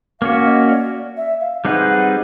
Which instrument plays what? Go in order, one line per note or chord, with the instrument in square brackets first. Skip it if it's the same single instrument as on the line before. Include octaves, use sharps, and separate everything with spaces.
[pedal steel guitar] A#3 C#4 F#4 [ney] F5
[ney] D#5
D5
E5
F5
[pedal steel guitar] G3 C4 D#4 G#4 B4 [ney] F#5
[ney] F#5